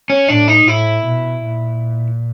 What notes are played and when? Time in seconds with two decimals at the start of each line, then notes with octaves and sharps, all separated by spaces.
0.10 C#4
0.28 A2 D4
0.48 D#4
0.67 A2 E4
1.06 B2
1.45 A#2